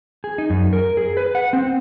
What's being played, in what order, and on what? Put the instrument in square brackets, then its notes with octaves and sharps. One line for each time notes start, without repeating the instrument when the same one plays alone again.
[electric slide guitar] G#4
D#4
F#2
A#4
G#4
B4
F#5
C4